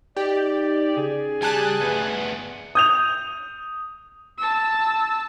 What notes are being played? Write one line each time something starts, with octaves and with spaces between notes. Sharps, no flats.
D#4 G4 D5
C#3 G#4
G3 G#5 A5 F#6
D2 B3
D#6 G6 F7
A5 E6